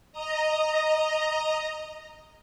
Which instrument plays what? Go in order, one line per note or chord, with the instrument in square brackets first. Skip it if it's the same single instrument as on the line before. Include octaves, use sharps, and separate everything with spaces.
[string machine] D#5 A#5